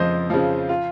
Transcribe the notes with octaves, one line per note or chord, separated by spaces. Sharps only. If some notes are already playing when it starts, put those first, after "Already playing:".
Already playing: F2 C#3 F3 C5 D#5
C#3 F3
F4